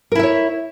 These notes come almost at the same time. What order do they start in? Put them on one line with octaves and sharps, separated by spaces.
A#4 E4 E5 C#5